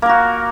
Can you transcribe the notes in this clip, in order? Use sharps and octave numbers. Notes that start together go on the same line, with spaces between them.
A#3 F#4 A#4